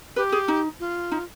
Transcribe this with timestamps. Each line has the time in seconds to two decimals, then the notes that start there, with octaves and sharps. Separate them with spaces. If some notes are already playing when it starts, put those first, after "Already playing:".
0.16 G4 B4
0.32 G#4
0.48 D#4
0.80 F4
1.11 D#4